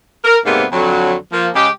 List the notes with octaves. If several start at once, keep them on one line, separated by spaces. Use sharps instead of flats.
A#4
G#2 C3 G3 A#3 B3
F2 D3 F#3
F3 A#3
C#3 G#3 G4